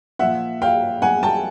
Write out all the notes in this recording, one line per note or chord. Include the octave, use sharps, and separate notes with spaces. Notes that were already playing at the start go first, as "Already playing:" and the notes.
A#2 F3 E5 F#5
F5 G5
F#5 G#5
G5 A5